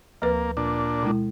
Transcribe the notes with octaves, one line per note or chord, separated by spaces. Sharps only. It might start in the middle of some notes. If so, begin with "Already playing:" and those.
D2 F3 A#3 B4
A#2 D4
B2 G#3 E4